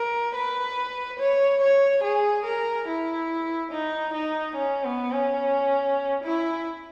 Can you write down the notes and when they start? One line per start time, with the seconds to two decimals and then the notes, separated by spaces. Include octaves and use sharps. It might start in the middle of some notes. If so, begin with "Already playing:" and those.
Already playing: A#4
0.35 B4
1.19 C#5
1.61 C#5
2.04 G#4
2.45 A#4
2.88 E4
3.72 D#4
4.14 D#4
4.56 C#4
4.84 B3
5.12 C#4
6.24 E4